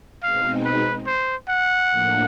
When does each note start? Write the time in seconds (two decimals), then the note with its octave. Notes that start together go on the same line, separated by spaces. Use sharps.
0.23 B2 G#3 C4 D#4 F5
0.65 B4
1.06 C5
1.48 F#5
1.90 A2 F3 A#3 D4